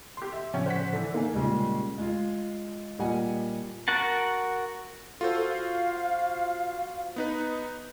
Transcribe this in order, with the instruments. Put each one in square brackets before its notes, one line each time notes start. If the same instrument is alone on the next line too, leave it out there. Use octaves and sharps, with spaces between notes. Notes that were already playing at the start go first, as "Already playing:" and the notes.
[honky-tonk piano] G4 C6
E5
[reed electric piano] A2 C#3 F3 [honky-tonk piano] C#4 G5
[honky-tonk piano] C5 F#5 B6
D3 E3
[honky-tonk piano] A#3 [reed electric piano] D#4 G#5
[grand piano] A#2 C#3 G3 G#3
G#3 F4
A#2 G3 D#5 F#5 G#5
[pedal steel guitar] F#4 A#4 F#5 A5
[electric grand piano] F4 F#4 C5 [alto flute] A4
[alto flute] F5
[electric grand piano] B3 D#4 B4